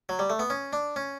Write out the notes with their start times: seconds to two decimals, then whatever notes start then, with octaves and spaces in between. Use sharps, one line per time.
0.09 F#3
0.19 G3
0.30 A3
0.39 B3
0.50 C#4
0.73 D4
0.96 C#4